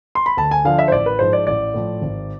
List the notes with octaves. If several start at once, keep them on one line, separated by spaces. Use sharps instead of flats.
C6
B5
D2 A5
G#5
D3 F3 F5
E5
C5
A1 D5
B4
G#2 F3 C5
D5
A1 D5
A2 F3
G#1